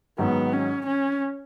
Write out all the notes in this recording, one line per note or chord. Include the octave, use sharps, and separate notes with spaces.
G#2 D#3 F#3 B3
C#4
C#4